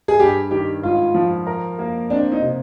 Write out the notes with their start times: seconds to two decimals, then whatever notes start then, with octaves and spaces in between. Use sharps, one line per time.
0.08 G#4
0.19 G2 G4
0.51 D#3 G4
0.83 G#2 F4
1.14 F3
1.47 A#4
1.79 A#3
2.10 C4 D4
2.32 D#4
2.42 C3